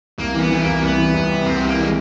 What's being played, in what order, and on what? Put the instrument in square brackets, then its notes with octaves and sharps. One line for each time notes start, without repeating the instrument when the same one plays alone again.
[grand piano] C2 [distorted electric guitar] A#3
[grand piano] E3 [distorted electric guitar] B3
[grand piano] E3 [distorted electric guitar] A3
[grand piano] C2 [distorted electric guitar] A#3
[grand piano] C2 [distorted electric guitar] B3
[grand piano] E3
C2
C3
[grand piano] C2 [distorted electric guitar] C4
[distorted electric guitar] B3
[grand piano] C2
[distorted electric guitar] A#3
[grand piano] E3 [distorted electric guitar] G#3